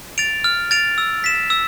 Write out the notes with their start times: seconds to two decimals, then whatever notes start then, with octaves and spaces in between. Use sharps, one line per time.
0.18 A6 D7 F7
0.44 F6
0.71 A6 D7 F7
0.98 E6
1.24 B6 E7
1.50 E6